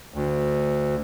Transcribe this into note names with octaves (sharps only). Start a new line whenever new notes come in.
D2